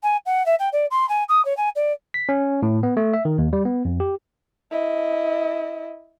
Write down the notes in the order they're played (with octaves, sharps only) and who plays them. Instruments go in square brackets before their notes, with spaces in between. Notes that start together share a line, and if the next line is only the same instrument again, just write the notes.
[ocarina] G#5
F#5
E5
G5
D5
C6
G#5
D#6
C#5
G#5
D5
[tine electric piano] B6
C#4
A2
B3
A3
E5
D#3
D#2
G3
B3
F2
G4
[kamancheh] E4 D#5